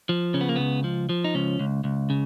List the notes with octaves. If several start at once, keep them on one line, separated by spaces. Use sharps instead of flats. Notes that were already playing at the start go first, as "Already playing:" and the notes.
F3
C#3 C#4
B3
A#3
C#2 B3
F3
F3
D#4
C#2 C#4
C#2
C#2
C#3